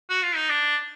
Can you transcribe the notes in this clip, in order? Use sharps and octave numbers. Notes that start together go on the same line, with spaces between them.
F#4
F4
D#4
D4